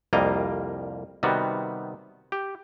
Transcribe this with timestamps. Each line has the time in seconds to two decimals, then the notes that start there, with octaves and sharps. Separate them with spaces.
0.13 C2 F2 G3 A#3 D#5 A#5
1.23 C3 D#3 G3 B3 F#4
2.32 G4